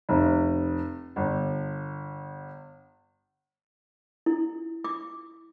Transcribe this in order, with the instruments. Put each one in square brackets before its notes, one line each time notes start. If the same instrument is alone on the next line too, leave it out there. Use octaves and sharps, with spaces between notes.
[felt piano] F1
G1
[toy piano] E4
D6